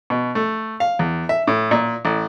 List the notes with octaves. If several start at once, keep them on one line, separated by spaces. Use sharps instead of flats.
B2
A3
F5
E2
E5
A2
A#2
A1